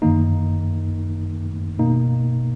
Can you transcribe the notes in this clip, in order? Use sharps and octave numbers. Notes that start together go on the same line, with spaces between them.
F#2 D#3 A#3 D#4
B2 A#3 D#4